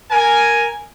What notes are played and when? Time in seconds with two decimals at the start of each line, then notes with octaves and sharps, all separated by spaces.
0.11 A#4 G#5